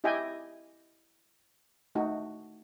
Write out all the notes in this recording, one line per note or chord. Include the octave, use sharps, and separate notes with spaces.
E4 G4 D#5 E5 G5 G#5
A3 D#4 F#4